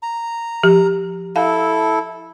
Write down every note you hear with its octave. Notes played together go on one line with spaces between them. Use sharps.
A#5
F3 G4
E4 A4 F5 A5